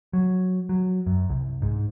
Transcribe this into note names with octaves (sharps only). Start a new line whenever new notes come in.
F#3
F#3
F#2
C2
G#2